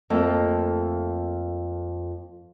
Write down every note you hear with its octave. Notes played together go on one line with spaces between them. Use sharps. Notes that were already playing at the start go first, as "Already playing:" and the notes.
F2 A3 A#3 A4